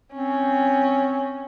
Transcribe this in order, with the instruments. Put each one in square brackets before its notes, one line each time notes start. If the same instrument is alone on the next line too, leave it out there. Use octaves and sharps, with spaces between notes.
[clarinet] C4 [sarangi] C#4